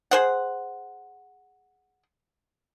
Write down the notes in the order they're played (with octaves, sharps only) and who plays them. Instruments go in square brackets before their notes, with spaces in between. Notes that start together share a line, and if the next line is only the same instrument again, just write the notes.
[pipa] G#4 C5 F#5